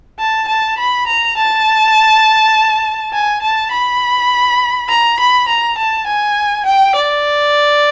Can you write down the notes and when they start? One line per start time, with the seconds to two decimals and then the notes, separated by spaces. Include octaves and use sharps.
0.19 A5
0.48 A5
0.78 B5
1.07 A#5
1.37 A5
3.13 G#5
3.42 A5
3.72 B5
4.89 A#5
5.19 B5
5.48 A#5
5.78 A5
6.07 G#5
6.66 G5
6.95 D5